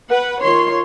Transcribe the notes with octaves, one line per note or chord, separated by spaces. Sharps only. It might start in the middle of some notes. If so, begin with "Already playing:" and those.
B4 F#5
D#3 F4 C#5 C6